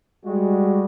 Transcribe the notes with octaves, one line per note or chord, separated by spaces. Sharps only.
G3 G#3 F#4